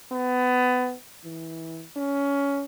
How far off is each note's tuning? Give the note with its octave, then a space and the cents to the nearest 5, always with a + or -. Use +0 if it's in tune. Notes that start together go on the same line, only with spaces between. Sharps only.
B3 +25
E3 -20
C#4 +20